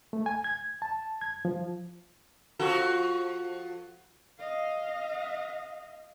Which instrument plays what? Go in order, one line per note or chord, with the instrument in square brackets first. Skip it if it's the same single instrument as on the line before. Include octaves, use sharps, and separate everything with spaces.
[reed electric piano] A3
G#5
G#6
A5
G#6
F3
[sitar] F3 F#4 A4
[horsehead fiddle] D#5 F5